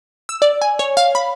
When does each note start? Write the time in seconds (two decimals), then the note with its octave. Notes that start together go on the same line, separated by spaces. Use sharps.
0.29 E6
0.42 D5
0.62 G#5
0.79 C#5
0.97 F5
1.15 B5